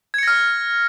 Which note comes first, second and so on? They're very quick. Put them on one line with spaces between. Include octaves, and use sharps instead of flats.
G#6 C#7 A#6 F6